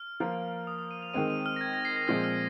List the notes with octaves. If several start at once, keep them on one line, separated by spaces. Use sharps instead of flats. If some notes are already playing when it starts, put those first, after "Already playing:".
Already playing: F6
F3 A#3 F4 A#4
D#6
D#6
D#7
F7
D#3 G#3 C4 D#7
D#7
F6
A#6
G#6
A#6
C7
A#6
A#2 F3 G#3 C4 F6
F6